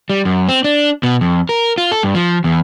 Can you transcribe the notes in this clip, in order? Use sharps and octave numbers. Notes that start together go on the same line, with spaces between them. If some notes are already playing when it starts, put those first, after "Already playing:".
G3
F#2
C4
D4
B2
F2
A#4
F4
A4
G2
F3
E2